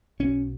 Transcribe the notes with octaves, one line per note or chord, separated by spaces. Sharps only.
B1 B2 C#4